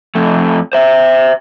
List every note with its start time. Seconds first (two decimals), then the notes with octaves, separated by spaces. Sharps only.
0.15 F2 A3
0.73 C5 E5